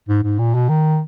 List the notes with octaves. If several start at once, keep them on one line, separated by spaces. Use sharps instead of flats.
G#2
G#2
A#2
B2
D#3